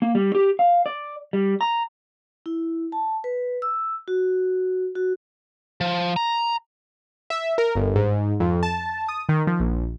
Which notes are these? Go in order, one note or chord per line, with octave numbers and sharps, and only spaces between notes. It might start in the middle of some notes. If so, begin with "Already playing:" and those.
A#3
G3
G4
F5
D5
G3
A#5
E4
A5
B4
E6
F#4
F#4
F3
A#5
E5
A#4
G1
G#2
F2
A5
D#6
D#3
F3
A#1